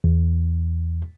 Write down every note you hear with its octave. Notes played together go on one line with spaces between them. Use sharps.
E2